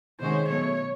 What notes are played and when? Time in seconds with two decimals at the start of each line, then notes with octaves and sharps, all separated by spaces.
0.20 C3 D#3 G#3 C#4 F#4 C5
0.49 B2 F#3 A3 C#5